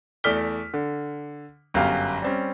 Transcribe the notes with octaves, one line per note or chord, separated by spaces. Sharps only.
E2 A3 D5 F6 B6 G7
D3
G1 F#2 G4 F5
G3 C4 C#4